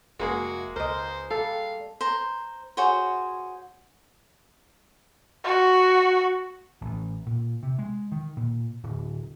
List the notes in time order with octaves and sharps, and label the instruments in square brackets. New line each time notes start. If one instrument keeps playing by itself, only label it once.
[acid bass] F1 [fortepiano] G#3 A#3 G#4 [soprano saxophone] F#4
[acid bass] C#2 [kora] A#4 D#5 [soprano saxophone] C5
[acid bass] G3 [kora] A4 [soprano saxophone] F5
[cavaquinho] C5 A#5
F#4 G#4 C5 C#5
[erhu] F#4
[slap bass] A1
A#2
C3
G#3
D#3
A#2
D1